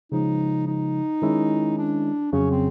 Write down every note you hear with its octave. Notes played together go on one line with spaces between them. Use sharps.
C#3 F3 G#3 D#4
D#4
D#3 G#3 C#4 E4
D4
F2 C#3 F#3 C#4
C4